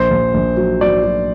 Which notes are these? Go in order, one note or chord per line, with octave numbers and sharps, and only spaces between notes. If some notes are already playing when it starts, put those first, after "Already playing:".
Already playing: A#1 C5
A#1
A#1
F#3
F#3 D5
F#3